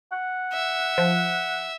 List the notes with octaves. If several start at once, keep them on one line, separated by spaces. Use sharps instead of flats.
F#5
E5
F3